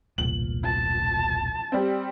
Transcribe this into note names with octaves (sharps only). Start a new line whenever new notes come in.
E1 C2 A#2 F#7
A5
G3 C4